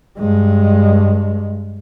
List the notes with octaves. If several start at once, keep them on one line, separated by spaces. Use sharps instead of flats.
G2 G#3